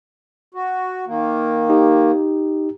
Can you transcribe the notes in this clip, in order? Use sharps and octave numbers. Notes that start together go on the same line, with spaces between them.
F#4
D#3 A#3
D#4 G4